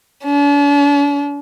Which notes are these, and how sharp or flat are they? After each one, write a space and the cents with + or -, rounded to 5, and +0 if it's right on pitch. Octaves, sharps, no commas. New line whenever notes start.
D4 -45